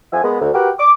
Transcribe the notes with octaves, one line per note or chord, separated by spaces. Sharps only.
F2 F3 E5 F#5 G#5
G#3 A#3 B3
D2
F#4 G4 A#4 B4 F#5 G5
D6